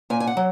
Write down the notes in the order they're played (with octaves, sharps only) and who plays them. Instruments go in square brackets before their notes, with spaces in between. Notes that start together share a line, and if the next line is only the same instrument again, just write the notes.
[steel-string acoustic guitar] A#2 G#5
G#5
F#5
F#3